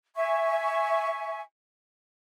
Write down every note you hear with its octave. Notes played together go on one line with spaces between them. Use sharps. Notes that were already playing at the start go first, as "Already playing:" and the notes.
E5 G#5 C#6